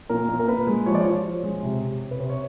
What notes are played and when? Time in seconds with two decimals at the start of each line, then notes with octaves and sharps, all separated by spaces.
0.09 A#2 A#4
0.29 A#2
0.39 A#4
0.48 A#2 B4
0.67 G#3
0.86 F3 C#5
0.95 D5
1.04 F3 C#5
1.24 F3
1.43 G#3
1.63 C3
1.81 C3
2.01 C3
2.11 B4
2.20 C3 C5
2.30 C#5